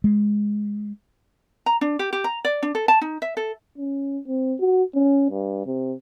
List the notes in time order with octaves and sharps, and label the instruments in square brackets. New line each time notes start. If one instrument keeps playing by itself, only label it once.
[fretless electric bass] G#3
[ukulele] A#5
D4
G4
G4
A#5
D5
D4
A4
A5
D#4
E5
A4
[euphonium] C#4
C4
F#4
C#4
G2
C3